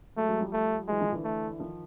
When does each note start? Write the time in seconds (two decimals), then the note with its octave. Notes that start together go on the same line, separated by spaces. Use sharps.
0.17 F#3 G#3 A3
0.28 F#3 G#3
0.40 F3 G3
0.53 A3
0.88 E3 F#3 G#3
1.00 D#3 F3
1.12 D3 E3
1.24 A3
1.59 D#3 F3